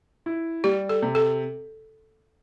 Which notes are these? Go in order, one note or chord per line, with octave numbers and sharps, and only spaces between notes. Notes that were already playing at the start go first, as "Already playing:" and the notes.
E4
G3 G4
A4
C3
A4